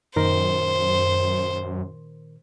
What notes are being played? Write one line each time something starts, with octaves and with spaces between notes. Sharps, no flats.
F#2 A#2 D#3 A#4 C5